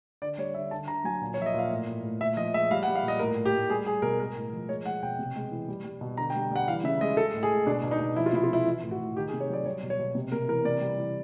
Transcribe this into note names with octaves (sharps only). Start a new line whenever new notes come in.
D3 D5
G3 C#5
D3 E5
D3 A5
D3 A#5
F#3 G#5
A#2
C#5
F3 E5
D#5
A#2 F5
A2
A2
A2
A#2 E5
F3 D#5
G#3 E5
G3 F5
F#5
G3
F5
A#2
D#5
A2 A#4
A2
G4
A2
G3 G#4
G3 G#4
B2 A#4
G#3 A#4
A2
F3
G#3 C#5
G#3 F#5
B2 G5
C3
G#3
E3
G3
G3
B2
D3 A#5
G5
G3
G3 F#5
E3 F5
C#3 E5
G#3 D#5
G#3 A4
A2
G#4
G#3
B2 D4
B2
D#4
B2
F3 E4
F4
C3 E4
F4
G#3 E4
E3
A2
F#4
A2
D#3 G4
G#4
C3
C#5
F#3 D5
G3 C#5
B2
C#5
B2
C3
C3 A#4
E3 A#4
C3 D5
G3
E3